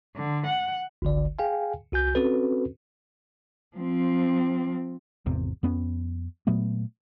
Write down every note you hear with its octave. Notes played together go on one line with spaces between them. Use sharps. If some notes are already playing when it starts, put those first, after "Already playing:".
D3
F#5
G1 C#2 D3 D5
G#4 F5 G5 G#5
C2 F#4 G#5 G6
C4 C#4 F#4 A4 B4
F3 C4
G#1 E2 C3
F2 B3 C#4
A#2 F#3 A3 B3